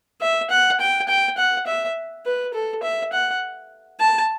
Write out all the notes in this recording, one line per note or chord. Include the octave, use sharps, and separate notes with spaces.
E5
F#5
G5
G5
F#5
E5
B4
A4
E5
F#5
A5